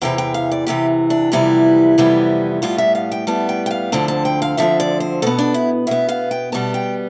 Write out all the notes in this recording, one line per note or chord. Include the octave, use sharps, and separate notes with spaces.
E2 C3 E3 G5
G5
F5
D5
E2 C3 E3 G4
D4
F2 C3 E3 G3 B3 E4
F2 C3 E3 G3 B3
A2 G3 B3 F4
E5
F5
G5
A2 G3 B3 A5
G5
G5
F5
D2 D3 F3 C4 A5
A5
G5
F5
D2 D3 F3 C4 E5
D5
C5
B2 B3 A4
D4
E4
B2 B3 E5
F5
G5
B2 G3 B3 A5
G5